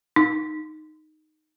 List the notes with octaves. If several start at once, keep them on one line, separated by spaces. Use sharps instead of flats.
D#4